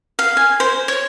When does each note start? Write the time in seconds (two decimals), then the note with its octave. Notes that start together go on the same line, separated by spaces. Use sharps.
0.19 F5
0.37 G#5
0.60 C5
0.88 C#5